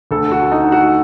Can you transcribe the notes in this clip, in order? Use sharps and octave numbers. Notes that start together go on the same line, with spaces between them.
D2 D3 A4
F#4
D#4
F#4